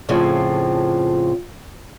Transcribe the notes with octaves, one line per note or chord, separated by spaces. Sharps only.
F2 A2 C#3 F3